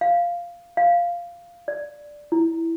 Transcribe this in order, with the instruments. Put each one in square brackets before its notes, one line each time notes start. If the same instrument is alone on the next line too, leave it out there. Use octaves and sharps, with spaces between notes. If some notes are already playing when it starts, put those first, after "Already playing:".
[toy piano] F5
F5
D5
E4